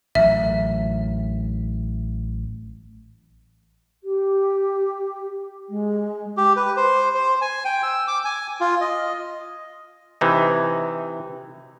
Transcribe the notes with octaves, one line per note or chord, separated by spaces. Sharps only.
A1 F#3 E5
G4
G#3
G4
B4
C5
C5
G#5
G5
E6
D6
G#5
F4
D#5
C3 E3 D#4